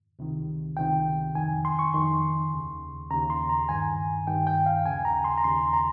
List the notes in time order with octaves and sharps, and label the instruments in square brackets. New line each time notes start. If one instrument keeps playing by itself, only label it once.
[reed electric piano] C#2 C3 D#3
C#2 C3 D#3 G5
F2 D#3 G#5
C6
C#6
F2 D#3 C6
D#2 C#3
D#2 C#3 A#5
C6
A#5
G2 D#3 G#5
G2 D#3 G5
G5
F5
D#2 C#3 G#5
A#5
C6
A#5
D#2 C#3 C6
A#5